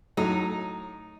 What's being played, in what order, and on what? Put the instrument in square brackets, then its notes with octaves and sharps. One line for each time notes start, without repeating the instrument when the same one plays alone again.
[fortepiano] A2 F#3 [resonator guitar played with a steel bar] D#4